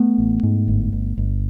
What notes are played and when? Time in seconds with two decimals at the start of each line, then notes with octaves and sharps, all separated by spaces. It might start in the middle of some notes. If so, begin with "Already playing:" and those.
Already playing: A3 B3
0.18 A1
0.43 G#2
0.68 G1
0.93 G1
1.18 G1